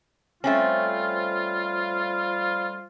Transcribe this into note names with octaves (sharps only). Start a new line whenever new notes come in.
F3 G3 A3 C4 C#4 F4